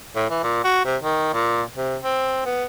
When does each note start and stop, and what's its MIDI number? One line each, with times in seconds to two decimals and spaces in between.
0.16 0.26 45
0.30 0.41 52
0.44 0.61 46
0.65 0.84 66
0.85 0.97 48
1.02 1.30 51
1.34 1.63 46
1.76 1.97 48
2.03 2.44 60
2.46 2.65 59